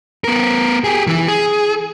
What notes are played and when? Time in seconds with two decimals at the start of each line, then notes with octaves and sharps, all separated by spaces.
0.24 B3 A#4
0.84 G4 G#4
1.07 E3 E4
1.28 G#4